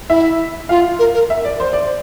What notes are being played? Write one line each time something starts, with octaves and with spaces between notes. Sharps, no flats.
E4 E5
F4 F5
A#4
A#4
E5
D5
C5
D5
C5